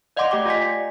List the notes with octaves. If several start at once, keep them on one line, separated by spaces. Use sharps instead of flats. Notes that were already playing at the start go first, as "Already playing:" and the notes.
D5 D#5 F5 F#5 C6 D6
A3 G4 G5 D6
F4 D5 D#5 G#5 B6